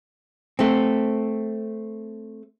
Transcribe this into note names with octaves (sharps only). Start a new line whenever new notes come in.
A3 C4